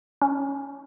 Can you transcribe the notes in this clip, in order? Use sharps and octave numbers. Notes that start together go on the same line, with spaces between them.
C#4